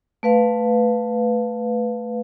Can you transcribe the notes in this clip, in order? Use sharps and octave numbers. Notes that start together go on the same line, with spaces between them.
A3 B4 F5